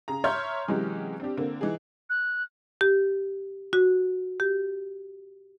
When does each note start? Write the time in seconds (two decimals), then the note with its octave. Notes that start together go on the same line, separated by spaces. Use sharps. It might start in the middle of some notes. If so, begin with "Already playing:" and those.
0.08 C#3 G#4 A#5
0.24 C#5 E5 A#5 C6 F6 G6
0.68 C3 E3 F#3 G#3 C#4 G4
1.20 C4 D4 G4
1.37 D3 A#3 C4
1.61 E3 D#4 G#4
2.10 F#6
2.81 G4
3.73 F#4
4.40 G4